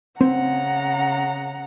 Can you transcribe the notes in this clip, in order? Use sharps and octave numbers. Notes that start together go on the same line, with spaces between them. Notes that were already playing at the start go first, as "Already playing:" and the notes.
C#3 C4 F#5 A#5